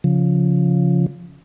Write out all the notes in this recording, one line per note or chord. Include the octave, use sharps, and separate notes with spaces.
C#3 F3